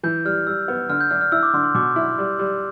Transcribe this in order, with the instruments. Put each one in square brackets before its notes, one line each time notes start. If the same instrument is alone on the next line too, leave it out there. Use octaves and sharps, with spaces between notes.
[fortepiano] E3 [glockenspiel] G6
[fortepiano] G3 [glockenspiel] F6
[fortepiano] G3 [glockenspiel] E6
[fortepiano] B3
[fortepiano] D3 [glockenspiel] F6
[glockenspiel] G6
[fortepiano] D4 [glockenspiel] F6
[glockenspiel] F6
[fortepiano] E4 [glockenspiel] E6
[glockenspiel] D6
[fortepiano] D3 [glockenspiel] C6
[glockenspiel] C6
[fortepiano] B2 [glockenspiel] D6
[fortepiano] E4
G3
G3